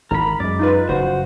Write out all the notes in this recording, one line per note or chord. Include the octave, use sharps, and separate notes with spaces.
G#1 A#4 B5
F#2 G#3 D5
D#4 F4 B4
F#1 B2 F3 F#4 C5